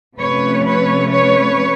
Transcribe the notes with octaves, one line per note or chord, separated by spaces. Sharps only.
C3 F3 A3 C#4 B4 C#5
B4 C#5
B4 C#5